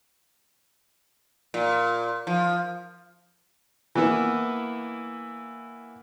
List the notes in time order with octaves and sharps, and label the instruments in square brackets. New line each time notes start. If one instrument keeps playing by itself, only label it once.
[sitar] A#2
F3
[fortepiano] E3 A#3 B3 E4